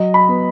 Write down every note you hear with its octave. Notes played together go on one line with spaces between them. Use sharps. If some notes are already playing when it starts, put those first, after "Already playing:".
Already playing: F#3 D#5
B5
B3